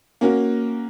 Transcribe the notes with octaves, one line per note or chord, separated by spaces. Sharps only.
A#3 C#4 F#4 A#4